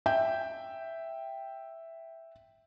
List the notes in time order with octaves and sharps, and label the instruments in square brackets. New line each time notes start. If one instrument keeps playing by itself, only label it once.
[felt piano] E5 G5 G6